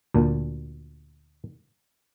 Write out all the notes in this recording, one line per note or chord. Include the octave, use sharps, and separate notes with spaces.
D2 A#2